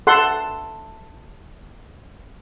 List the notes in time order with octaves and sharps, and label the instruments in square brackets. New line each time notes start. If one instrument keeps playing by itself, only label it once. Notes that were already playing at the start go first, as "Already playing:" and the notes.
[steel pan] A4 F#5 C6